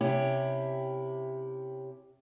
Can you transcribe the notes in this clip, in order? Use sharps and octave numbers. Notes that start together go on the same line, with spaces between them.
C3 C#4 E4 G4